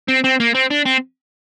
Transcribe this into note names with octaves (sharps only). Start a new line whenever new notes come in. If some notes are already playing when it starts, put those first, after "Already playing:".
C4
C4
A#3
C4
D4
C4